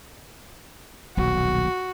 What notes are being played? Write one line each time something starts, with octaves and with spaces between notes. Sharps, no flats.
D#1 B1 F#4